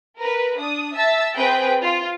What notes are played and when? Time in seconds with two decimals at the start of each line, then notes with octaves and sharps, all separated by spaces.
0.18 A#4 B4
0.59 D4 D#6
0.95 E5 A5 E6 A6
1.36 C4 G#4 B4 G5
1.83 F4